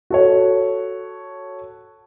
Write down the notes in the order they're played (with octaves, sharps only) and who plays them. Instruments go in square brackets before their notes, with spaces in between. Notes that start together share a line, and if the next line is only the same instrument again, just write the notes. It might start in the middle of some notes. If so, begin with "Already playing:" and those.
[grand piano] F#4 A4 C#5